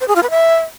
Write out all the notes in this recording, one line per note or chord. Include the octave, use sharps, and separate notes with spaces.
C5
G#4
F4
B4
E5